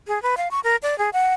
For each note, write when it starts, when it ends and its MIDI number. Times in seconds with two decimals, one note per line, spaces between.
0.07 0.21 68
0.22 0.35 71
0.37 0.48 77
0.51 0.60 85
0.64 0.76 70
0.83 0.98 74
0.98 1.10 68
1.13 1.34 78